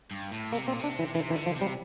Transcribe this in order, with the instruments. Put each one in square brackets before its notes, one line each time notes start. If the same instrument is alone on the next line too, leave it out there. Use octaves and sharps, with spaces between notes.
[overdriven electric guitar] G2
A2
[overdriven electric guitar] C3 [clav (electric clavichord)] A#3
[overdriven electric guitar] A#2 [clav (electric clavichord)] C4
[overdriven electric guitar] C3 [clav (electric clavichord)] D4
[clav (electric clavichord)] E3
[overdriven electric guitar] C3 [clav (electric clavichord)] E3
[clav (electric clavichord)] E3
[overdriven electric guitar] D3
[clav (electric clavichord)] F3
[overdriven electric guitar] C3
[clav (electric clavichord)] G3